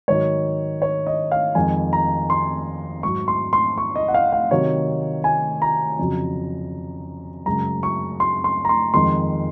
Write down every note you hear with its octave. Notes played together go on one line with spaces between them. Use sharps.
G#2 D#3 F#3 C#5
C#5
D#5
F5
F2 D#3 G#3 G#5
A#5
C6
G#2 F#3 C#6
C6
C6
C#6
D#5
F#5
F5
F5
C3 D#3 F#3 C#5
G#5
A#5
F2 C#3 F#3
F#2 C#3 G#3 A#5
C#6
C6
C6
A#5
C6
F2 D#3 G#3 C6